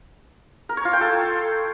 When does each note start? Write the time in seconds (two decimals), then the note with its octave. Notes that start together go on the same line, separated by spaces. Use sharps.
0.69 A#4
0.77 C#5
0.85 F4
0.93 G5
1.01 A4